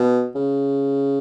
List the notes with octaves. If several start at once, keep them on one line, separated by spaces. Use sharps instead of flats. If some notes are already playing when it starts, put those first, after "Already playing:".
Already playing: B2
C#3